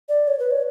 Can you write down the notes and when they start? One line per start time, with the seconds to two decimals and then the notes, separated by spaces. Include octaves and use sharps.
0.09 D5
0.28 C#5
0.39 B4
0.51 C#5